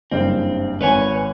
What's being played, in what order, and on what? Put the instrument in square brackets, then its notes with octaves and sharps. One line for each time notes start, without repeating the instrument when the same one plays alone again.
[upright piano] F#1 G2 C#3 [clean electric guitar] C4
[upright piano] G#1 [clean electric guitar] B4 C#5 G#5